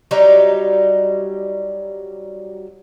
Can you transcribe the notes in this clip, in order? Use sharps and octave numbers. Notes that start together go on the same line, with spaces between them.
F#3 G3 D#4